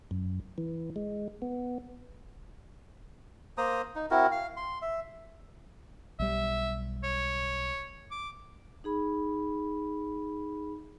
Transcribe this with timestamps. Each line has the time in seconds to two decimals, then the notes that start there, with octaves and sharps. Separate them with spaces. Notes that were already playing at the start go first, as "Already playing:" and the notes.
0.11 F#2
0.58 E3
0.96 G#3
1.42 B3
3.58 A#3 C5 A#5 D#6
3.95 D#4
4.11 C4 E4 F#4 A#4
4.32 F5
4.57 C6
4.82 E5
6.19 B1 G3 E5
7.04 C#5
8.11 D6
8.84 D#4 G#4 B5